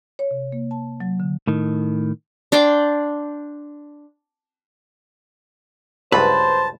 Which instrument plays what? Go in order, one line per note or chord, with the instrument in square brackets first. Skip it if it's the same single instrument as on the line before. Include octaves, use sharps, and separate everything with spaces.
[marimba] C#5
C3
A#3
A5
F#3
D3
[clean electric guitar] A2 D#3
[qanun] D4 D5 G5 C6
[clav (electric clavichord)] C#2 G2 F#3 [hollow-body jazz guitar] B4 [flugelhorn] C5 [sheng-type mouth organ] A5